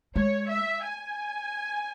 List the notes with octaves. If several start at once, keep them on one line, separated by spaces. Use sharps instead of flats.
G#3 C#5
E5
G#5